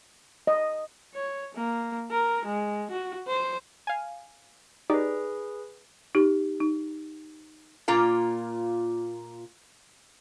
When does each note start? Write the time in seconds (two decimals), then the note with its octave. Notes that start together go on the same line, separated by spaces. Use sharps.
0.47 D#5
1.15 C#5
1.54 A#3
2.11 A#4
2.45 G#3
2.91 F#4
3.27 C5
3.87 F5 G#5
4.90 D#4 G4 G#4 B4 D5
6.15 D#4 G4
6.60 D#4
7.88 A#2 A#3 F4 F5